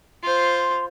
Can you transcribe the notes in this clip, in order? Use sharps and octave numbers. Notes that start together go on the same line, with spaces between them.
F4 C5 C6